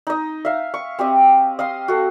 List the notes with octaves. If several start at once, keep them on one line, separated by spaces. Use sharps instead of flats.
D#4 D#5
E5 F5
C#6
C4 G4 D#5
D#5 F5 C6
F#4 A4